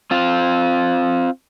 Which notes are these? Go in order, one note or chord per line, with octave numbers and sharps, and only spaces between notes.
C4 F4